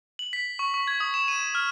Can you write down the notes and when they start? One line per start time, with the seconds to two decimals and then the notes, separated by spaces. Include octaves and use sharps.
0.19 F#7
0.33 B6
0.59 C#6
0.74 C#6
0.88 G#6
1.00 D#6
1.14 E7
1.28 D#7
1.55 F6